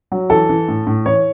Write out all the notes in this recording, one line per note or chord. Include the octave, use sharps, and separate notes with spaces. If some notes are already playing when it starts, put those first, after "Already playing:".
F#3
E3 A4
E3
A2
A2
E3 C#5